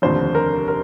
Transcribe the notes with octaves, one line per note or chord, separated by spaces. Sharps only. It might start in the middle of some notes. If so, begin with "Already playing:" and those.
F1 D#2 D3 F3 C5
A#4
A#4